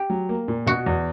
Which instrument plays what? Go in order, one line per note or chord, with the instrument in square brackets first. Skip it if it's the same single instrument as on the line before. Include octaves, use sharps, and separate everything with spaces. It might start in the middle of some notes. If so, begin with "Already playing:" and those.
Already playing: [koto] G4
[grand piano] F#3
A#3
A#2
[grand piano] B2 [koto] F#4
[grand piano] E2